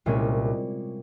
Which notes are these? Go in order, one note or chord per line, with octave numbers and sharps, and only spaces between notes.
C2 A#2 G#3 C#4